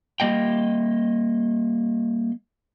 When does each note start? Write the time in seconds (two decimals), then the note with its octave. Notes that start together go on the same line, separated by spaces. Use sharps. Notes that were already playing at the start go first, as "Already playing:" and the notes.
0.20 G3 A#3 D#5 G5